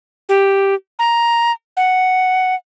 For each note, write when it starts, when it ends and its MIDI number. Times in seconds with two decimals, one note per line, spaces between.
0.29 0.75 67
0.99 1.52 82
1.77 2.55 78